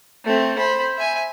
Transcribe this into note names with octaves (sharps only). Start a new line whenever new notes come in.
A3 C4
C5 B5
E5 G#5